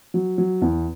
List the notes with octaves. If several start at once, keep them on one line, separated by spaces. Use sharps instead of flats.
F#3
F#3
E2